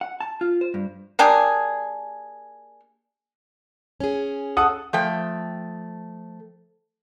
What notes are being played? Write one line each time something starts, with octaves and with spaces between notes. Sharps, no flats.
F#5
A5
F4
C5
G2
A#3 D4 G4 G#4
C#4 G#4
A4 F#5 D#6
F3 A3 G5